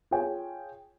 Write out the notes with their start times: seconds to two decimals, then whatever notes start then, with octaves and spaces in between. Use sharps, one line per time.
0.11 F4 G#4 C#5 G5 G#5